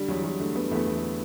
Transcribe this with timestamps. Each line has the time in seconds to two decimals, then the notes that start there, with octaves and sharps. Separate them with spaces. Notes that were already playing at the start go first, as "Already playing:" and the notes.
Already playing: D3 G3
0.08 E2 F#3
0.24 E2 G3
0.40 D3 A3
0.55 D3 B3
0.71 E2 A3
0.76 B3
0.87 E2
0.97 A3
1.02 D3